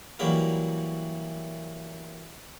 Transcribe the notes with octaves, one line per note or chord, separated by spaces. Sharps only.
E3 F#3 G3 A#3 E4 A#4